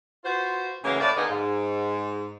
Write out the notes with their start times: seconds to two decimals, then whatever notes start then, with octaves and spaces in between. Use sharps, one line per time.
0.24 F4 F#4 B4 C5
0.83 A2 C#3 E3 F#3 A#3
0.99 A2 D5
1.16 D3 A#3 B3 D#4 F4 G#4
1.28 G#2